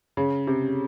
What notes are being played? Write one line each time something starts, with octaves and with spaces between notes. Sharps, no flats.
C#3
C3